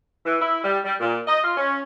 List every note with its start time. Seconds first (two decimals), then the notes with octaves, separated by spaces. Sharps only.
0.25 E3
0.40 E4
0.63 G3
0.85 G3
1.00 A#2
1.27 D#5
1.42 F4
1.56 C#4